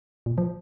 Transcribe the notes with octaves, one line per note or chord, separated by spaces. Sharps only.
A#2
F3